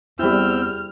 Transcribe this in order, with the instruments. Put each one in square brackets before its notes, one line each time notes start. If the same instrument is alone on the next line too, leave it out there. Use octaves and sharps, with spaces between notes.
[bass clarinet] E2 [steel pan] G3 E4 [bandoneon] C4 E6 G6 [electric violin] F6